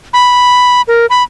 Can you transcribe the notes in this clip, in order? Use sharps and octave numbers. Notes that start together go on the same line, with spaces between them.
B5
A#4
B5